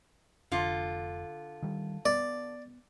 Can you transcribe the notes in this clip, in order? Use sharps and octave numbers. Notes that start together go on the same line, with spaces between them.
F1 D3 F4
D#3 G3
B3 D5